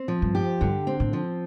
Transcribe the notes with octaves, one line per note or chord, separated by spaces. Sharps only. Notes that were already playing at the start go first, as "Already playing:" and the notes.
Already playing: C4
F3
G2
G4
G2 D3
C4
A2
F3